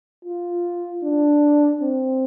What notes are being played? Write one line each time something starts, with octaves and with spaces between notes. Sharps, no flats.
F4
D4
C4